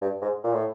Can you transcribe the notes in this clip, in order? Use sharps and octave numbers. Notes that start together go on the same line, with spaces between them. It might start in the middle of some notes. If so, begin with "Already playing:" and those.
G2
G#2
A#2
A2